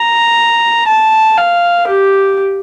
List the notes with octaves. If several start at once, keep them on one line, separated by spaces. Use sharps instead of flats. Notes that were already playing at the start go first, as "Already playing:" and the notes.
Already playing: A#5
A5
F5
G4